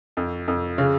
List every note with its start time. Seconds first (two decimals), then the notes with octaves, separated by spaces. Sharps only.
0.17 F2
0.48 F2
0.78 C#3